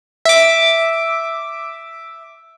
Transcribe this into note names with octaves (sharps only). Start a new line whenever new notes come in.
E5 D6